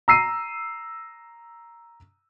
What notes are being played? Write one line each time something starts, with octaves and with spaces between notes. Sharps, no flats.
A#5 E6 C7 D#7